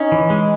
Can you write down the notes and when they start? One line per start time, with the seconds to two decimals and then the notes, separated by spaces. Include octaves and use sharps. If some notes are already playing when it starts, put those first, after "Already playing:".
Already playing: C#4 D#4
0.12 E3
0.30 G#3